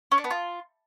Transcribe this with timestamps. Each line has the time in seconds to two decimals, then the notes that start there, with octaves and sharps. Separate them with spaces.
0.12 C#4
0.18 D4
0.24 B3
0.30 F4